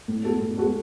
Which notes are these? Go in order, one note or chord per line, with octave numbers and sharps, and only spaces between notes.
A2
G#3 B3 F#4 A4
A2
G#3 B3 F#4 A4